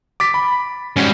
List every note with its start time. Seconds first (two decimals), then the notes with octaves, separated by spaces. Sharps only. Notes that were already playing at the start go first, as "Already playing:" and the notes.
0.20 D6 A6 B6
0.34 B5
0.96 G#2 G3 C#4 F#4